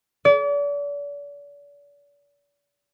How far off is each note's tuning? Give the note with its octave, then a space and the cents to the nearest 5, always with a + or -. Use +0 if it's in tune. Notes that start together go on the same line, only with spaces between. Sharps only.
D5 -40